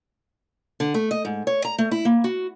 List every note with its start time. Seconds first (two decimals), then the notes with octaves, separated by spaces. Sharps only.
0.80 D3
0.94 A3
1.11 D#5
1.25 G#2
1.47 C#5
1.65 A#5
1.78 A3
1.91 E4
2.05 A#3
2.24 F#4